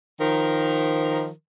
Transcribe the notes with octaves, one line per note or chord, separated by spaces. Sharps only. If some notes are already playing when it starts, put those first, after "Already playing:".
D#3 F3 A#4